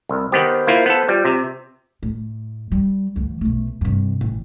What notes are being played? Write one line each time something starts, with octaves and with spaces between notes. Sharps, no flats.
C2
D#3 B3 G4 C5
A#3 E4 F4
B3 A4
G3 F4
C3
A2
G3
D2 E3
B1 A3
G2 C3
A1